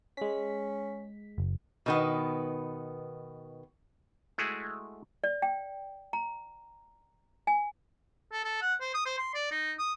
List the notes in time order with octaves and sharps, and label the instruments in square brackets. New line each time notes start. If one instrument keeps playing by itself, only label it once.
[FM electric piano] G#3 B6 [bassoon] C#4
[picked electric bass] F#1
[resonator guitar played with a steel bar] B2 D#3 B3
[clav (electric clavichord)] G#3 A3 E4 F#4 G#4
[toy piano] D5
G5
A#5
G#5
[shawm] A4
A4
F#5
C5
D#6
C5
C6
D5
D#4
D#6